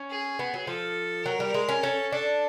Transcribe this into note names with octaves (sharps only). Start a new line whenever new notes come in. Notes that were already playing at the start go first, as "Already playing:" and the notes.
Already playing: C#4
G#4
B3
F#3
F3 A4
F#3 A#4
G3
G#3
C#4
C#4 A4
D4 A4